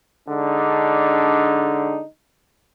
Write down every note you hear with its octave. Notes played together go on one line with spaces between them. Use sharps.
D3 G#3 D4 D#4